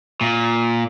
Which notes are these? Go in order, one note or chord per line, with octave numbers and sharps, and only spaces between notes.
A#2